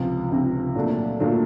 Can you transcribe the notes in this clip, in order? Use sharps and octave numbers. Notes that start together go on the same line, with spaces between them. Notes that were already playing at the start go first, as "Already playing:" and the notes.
Already playing: C#2 C3 F3
C#2 C3 F3
A#2 F#3 A3 D4
A#2 F#3 A3 D4